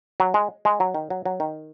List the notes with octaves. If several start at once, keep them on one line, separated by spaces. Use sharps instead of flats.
F#3
G#3
G#3
F#3
D#3
F#3
F#3
D#3